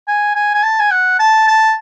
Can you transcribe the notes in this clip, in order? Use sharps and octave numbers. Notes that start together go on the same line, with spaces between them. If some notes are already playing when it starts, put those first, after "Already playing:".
G#5
G#5
G#5
A5
G#5
F#5
A5
A5